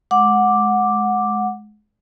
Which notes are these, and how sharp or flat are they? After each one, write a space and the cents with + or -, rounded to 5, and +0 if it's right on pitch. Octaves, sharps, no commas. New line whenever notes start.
G#3 +25 F#5 -15 D6 +0